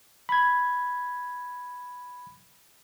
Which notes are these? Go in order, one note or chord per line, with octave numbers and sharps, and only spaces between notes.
B5 G#6